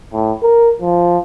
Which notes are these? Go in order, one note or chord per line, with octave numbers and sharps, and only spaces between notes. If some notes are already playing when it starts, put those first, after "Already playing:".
A2
A#4
F3